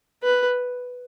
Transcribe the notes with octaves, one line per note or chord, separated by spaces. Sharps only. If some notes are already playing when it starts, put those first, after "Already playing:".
B4